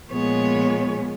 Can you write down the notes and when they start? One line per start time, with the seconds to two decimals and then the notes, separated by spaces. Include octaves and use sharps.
0.10 A#2 F3 G#3 B3 C#5